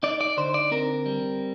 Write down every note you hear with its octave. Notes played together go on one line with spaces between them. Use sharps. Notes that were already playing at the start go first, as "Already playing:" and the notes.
D#4 D5
D5
D3 C5
D5
C4 A#4
G3